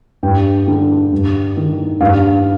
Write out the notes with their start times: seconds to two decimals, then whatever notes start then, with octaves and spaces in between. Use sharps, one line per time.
0.23 G2 G5
0.67 D3
1.12 G2
1.57 D#3
2.00 G2 F5